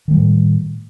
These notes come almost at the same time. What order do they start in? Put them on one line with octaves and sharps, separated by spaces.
D#3 A3 G3 A2